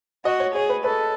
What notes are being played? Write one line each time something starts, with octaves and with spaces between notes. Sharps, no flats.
F#4 D#5
C#5
G#4 C#5
B4
A4 B4